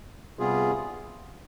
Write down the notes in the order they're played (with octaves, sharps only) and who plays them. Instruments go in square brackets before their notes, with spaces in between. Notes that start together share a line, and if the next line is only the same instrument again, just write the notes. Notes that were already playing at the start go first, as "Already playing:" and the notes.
[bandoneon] C3 G3 B3 F4 G#4